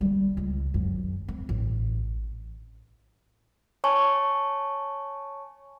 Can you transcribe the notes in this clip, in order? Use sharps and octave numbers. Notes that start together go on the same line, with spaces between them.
G3 A#3
C#2
G#1 F#2
C4
A1
C#5 G#5 A5 C#6